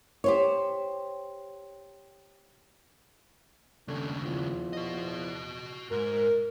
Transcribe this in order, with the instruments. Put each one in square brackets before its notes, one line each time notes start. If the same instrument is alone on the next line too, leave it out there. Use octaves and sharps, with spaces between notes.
[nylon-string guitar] G4 C5 C#5
[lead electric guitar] D#2 C#3 [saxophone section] A3 D4
[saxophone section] E2 F3
[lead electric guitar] F#4 D#5
[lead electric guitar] G#2 [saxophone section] A#4